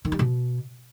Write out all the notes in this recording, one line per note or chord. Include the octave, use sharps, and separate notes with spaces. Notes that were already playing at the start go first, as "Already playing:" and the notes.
D#3
G3
B2